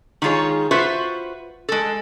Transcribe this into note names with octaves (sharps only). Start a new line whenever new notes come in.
D#3 G#3 F4 G#4 C#5
F4 F#4 B4 C5 E5
G#3 A4